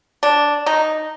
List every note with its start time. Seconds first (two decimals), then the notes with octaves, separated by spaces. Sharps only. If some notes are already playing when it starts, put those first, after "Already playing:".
0.23 D4
0.66 D#4